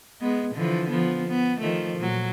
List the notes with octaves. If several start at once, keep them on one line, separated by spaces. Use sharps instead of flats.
G#3 B3
D3 E3 F3
F3 B3
B3
D#3 F3 A3
A#2 F#3